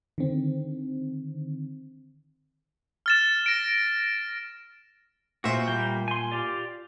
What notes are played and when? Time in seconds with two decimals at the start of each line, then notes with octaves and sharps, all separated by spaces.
0.18 D3 D#3 C4
3.06 F6 A6 E7
3.46 A#6 D7
5.44 A#2 F#4 C5 E5
5.68 G3 A#3 G5
6.08 G#5 C6
6.32 F4 G4 D5